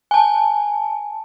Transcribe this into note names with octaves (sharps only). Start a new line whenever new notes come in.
G#5 A5